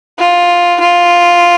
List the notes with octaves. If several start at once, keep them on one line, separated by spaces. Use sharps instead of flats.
F4
F4